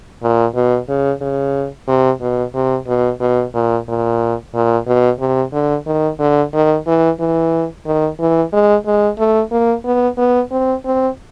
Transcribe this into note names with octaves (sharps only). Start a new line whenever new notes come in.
A#2
B2
C#3
C#3
C3
B2
C3
B2
B2
A#2
A#2
A#2
B2
C3
D3
D#3
D3
D#3
E3
E3
D#3
E3
G#3
G#3
A3
A#3
B3
B3
C4
C4